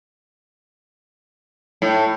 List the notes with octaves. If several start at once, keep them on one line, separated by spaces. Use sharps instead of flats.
A2